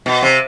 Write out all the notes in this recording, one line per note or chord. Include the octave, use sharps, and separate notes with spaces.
B2
C3